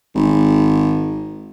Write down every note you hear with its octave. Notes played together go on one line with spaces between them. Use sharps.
G#1